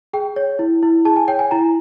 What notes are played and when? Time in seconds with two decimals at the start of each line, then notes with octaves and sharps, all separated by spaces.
0.13 G#4 G5
0.36 C#5
0.59 E4
0.83 E4
1.05 G#4 A5
1.16 G#5
1.28 C#5 G5
1.39 G#5
1.51 E4 A#5